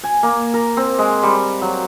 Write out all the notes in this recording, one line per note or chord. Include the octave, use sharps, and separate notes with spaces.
G#5
A#3
A#4
C4
G#3
G3
F#3